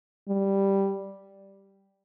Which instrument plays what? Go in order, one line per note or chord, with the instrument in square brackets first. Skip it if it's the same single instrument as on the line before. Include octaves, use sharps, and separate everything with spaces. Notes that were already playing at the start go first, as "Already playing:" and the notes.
[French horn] G3